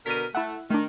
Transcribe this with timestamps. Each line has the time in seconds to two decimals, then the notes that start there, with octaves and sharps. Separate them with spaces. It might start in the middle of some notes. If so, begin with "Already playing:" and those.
0.06 B2 D3 A#4 B6 D#7
0.35 A3 E4 E5 F#5
0.70 D#3 A3 D4